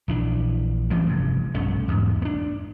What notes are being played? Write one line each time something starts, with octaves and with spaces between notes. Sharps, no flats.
A#1 E3 D4
E3 A3 C4 C#4
F1 G2
B1 G2 A3 C#4
E2 G#2
A#3 D4